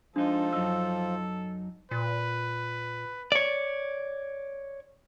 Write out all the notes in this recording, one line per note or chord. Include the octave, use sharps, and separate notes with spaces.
F3 G#3 D4 D#4 A4
F#2 F#3 D#4 E6
A#2 B4
C#5 D5